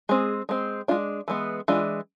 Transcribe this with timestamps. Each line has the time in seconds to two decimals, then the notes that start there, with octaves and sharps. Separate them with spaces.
0.09 G#3 C4 G#4
0.49 G#3 C4
0.88 G#3 D4 F4
1.28 E3 G#3 B3
1.68 E3 G#3 D4 F4